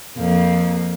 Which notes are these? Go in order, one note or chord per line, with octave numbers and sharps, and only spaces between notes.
F2 A#3